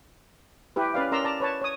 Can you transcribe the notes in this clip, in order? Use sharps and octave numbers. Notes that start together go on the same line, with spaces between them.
E4 G4 B4
C#4 B4 D5 F5
C#4 A#4 D5 A#5 C6 E6
D5 A5 A#5
B4 C#5 A5
C#5 D#6